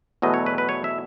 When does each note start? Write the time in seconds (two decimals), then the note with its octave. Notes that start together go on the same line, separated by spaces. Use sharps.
0.22 E2 B2 F#3 A3 D#5
0.34 C#5
0.46 B4
0.58 B4
0.69 C#5
0.84 E5